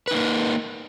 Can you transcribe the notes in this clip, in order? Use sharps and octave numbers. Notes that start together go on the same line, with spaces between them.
A#3 D#4 B4